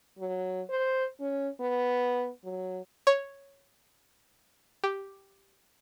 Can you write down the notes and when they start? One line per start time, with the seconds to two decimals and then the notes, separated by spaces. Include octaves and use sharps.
0.19 F#3
0.70 C5
1.20 C#4
1.60 B3
2.44 F#3
3.07 C#5
4.84 G4